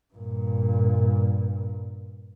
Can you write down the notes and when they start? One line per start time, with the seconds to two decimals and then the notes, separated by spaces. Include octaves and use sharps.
0.14 G2 A#2